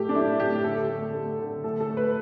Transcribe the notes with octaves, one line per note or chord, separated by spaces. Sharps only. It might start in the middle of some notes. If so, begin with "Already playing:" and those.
Already playing: A2 A3 G4
D4
A3 E4
A2 G4
D3 A4
A3
A3
D3
A2 A4
A4
A3
B4